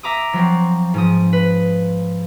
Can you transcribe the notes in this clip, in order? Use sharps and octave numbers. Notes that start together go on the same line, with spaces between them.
E5 A#5 D6 D#6
F3 F#3 C4
G#2 F3 D#6
B4